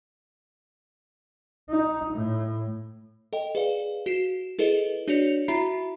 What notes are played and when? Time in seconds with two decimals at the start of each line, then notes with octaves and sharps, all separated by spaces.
1.70 D#4
2.14 A2
3.33 A4 D#5 G5
3.55 G#4 B4 D5 F5
4.06 F#4 C7 E7
4.59 E4 G#4 A4 B4 D#5
5.08 D4 F#4 C#5 D5 C#7 F7
5.48 E4 F#4 E5 A#5 B5 C7